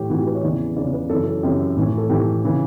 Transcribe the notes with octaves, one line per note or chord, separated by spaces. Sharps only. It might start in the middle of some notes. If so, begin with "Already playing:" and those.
Already playing: A2 E3 G4 A4
A2 E3 F#4
G4
B4
C#5
E2 C#3 E3 D5
E2 C#3 E3 D5
B4
F#2 C#3 E3 A4
A4
F#2 C#3 E3 G4
A2 E3
A4
A2 E3 G4
C#3 E3